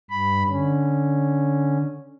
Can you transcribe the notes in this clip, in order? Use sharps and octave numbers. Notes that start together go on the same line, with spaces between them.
G2 B5
D3 C#4